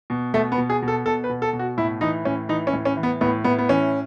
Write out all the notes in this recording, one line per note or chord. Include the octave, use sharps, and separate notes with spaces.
B2
B2 A3
B3
B2
G#4
B2
A4
B2 A4
B4
B2
A4
B2
F#4
A2 E4
E3 D#4
A2 C#4
E3 D#4
C#4
A2
C#4
E3
B3
A2 B3
A2 B3
B3
E3 C#4